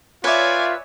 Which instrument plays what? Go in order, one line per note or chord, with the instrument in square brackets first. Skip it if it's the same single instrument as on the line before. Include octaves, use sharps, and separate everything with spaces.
[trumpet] F4 [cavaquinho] B4 D6 [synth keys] C#5 E5 [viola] D5 G#5